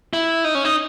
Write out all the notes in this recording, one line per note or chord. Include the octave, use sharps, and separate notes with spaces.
E4
D#4
C#4
D#4